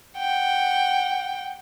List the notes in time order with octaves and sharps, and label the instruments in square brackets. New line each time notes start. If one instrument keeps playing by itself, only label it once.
[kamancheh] F#5 [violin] G5